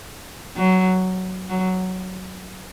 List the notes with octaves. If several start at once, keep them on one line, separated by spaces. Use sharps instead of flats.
F#3
F#3